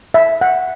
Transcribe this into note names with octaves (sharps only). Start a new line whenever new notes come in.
E5
F#5